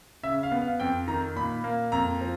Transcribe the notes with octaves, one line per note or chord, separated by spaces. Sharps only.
C#3 E5
F5
B3
F5
F2 G5
D#3 A#5
A#2 B5
A#3
F2 A#5
F3